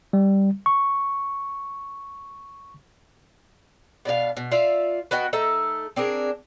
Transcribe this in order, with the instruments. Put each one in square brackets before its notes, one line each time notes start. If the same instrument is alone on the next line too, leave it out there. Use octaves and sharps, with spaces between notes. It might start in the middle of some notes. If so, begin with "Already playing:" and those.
[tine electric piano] G3
C#6
[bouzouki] B2 D4 G4 F5
B2
F4 D5 E5 F5
B3 F#4 D#5 G5
A3 D#4 A4 E5
C4 D4 G#4 A#4